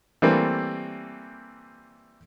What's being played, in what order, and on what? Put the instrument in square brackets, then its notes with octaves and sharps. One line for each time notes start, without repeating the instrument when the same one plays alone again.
[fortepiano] E3 G3 A3 A#3 C4